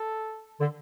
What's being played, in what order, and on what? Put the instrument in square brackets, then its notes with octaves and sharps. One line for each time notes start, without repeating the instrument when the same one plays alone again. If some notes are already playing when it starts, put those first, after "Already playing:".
Already playing: [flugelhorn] A4
[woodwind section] D3